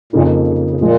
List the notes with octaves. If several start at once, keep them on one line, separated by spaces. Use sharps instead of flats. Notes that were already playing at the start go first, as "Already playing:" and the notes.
F2 A#2 C#3 A#3 D#4
C#3
C#3
C#3
A#2 F3 G#3 F4